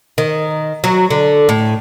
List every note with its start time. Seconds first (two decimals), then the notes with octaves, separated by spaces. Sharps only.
0.18 D#3
0.84 F#3
1.10 D3
1.49 A2